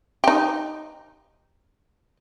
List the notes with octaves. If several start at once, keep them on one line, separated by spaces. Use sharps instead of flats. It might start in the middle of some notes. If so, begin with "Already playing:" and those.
D#4 G4